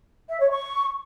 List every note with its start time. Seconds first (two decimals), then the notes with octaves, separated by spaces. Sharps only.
0.29 E5
0.40 C#5
0.51 C#6